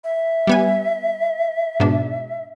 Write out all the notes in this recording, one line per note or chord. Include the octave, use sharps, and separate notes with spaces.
E5
G3 B3 G#5
G#2 B2 D4